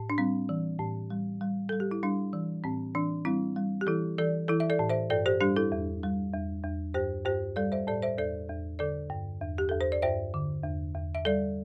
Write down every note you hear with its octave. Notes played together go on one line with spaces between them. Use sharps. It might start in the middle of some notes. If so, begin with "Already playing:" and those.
Already playing: A2
D4
G3 C4
E3
A2
G3
G3
G3 A4
G4
E4
G3 D4
E3
A2 C4
E3 D4
G3 C4 E4
G3
G4
E3 E4 A4
E3 A4 D5
E3 E4 A4
E5
A4 D5
A2
C5 E5
G2 A4 D5
G4 C5
G3 D4 G4
E4 A4
E2
G3
E2
E2
G2 G4 C5
G2 G4 C5
G3 A4 D5
C5 E5
A2 A4 D5
C5 E5
E2 A4 D5
E2
D3 A4 D5
G2
E2
G4
E2 A4
C5
D5
G2 C5 E5
D3
E2
E2
E5
G3 A4 D5